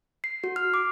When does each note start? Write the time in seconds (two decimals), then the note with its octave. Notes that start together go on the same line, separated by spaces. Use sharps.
0.24 C7
0.44 F#4
0.56 F6
0.74 D6